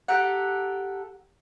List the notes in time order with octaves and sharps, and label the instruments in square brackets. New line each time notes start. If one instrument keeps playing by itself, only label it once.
[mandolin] G4 A4 A#4 F#5